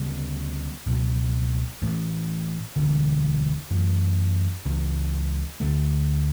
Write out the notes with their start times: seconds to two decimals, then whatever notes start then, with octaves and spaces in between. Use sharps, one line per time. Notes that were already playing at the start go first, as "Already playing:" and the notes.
Already playing: D2 C#3 G3 B3
0.86 C#2 B2 F#3
1.82 A1 A2 E3 A3
2.76 E1 D2 D3
3.70 F#2 E3 A3
4.65 C#2 C#3 E3
5.60 D2 D3 A3